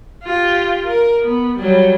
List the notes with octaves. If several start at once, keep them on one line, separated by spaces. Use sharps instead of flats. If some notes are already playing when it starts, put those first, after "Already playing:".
F4 G4
A#4
B3
F#3 G3